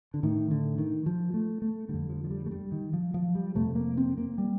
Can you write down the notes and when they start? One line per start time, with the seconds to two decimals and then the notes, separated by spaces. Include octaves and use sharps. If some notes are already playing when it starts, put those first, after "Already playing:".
0.14 D3
0.23 A2 D#3
0.51 D3
0.78 D#3
1.06 F3
1.34 A3
1.62 A3
1.89 F2 D3 G3
2.10 F3
2.24 F3
2.31 G3
2.46 A3
2.51 G3
2.72 D#3
2.93 F3
3.14 F3
3.35 G3
3.55 F2 C3 A3
3.75 A#3
3.97 C4
4.18 A#3
4.38 G3